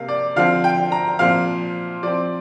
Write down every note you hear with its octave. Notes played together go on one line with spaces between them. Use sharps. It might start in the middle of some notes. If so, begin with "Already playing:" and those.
Already playing: C3 A#3 F5
D5
D3 F3 C4 F5
G5
A#5
A#2 F3 C4 F5
F3 C4 D5